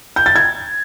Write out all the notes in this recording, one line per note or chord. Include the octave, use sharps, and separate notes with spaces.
G6
A6
G#6